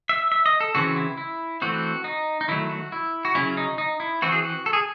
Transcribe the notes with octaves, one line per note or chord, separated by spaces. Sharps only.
E5
E5
D#5
A4
C#3 E3 C4 F#4
E4
E4
E3 A3 C4 F#4
D#4
D#4
D#3 F#3 A3 E4
F#4
E4
F#4
C#3 F#3 C#4 E4
D#4
D#4
E4
E3 C4 F#4
G#4
F#4
A4
G#4